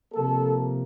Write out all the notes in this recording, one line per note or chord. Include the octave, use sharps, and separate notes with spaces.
C3 F3 A#3 A4